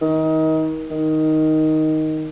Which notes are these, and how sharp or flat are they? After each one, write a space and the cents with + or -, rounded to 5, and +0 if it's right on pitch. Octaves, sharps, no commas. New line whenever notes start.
D#3 +25
D#3 +5